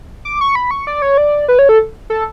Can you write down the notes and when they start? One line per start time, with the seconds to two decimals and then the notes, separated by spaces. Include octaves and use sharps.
0.25 D6
0.41 C#6
0.55 B5
0.71 C#6
0.87 D5
1.02 C#5
1.18 D5
1.48 B4
1.59 C#5
1.69 A4
2.10 A4